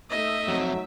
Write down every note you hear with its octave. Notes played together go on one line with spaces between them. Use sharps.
A3 D#4 D#5 E5
F2 C3 F#3